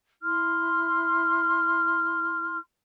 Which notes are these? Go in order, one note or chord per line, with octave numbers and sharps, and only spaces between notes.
E4 C6 F6